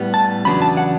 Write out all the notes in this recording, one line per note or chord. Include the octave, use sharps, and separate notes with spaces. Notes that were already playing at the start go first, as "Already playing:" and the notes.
Already playing: A2 G3 B3
A5
E2 C#3 F#3 B3 D4 B5
A5
F#5